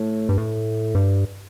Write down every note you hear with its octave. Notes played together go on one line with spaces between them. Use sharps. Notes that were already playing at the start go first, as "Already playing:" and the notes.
Already playing: A2
G2
A2
G2